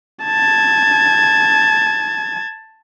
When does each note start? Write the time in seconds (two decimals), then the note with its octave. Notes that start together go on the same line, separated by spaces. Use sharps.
0.24 A5 G#6